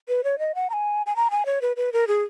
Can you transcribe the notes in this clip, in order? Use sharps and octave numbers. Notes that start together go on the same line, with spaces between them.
B4
C#5
D#5
F#5
A#5
G#5
G#5
A#5
G#5
C#5
B4
B4
A#4
G#4